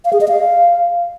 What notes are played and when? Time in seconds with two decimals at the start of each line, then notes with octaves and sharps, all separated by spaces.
0.05 F5
0.13 G#4
0.21 D#5
0.29 F5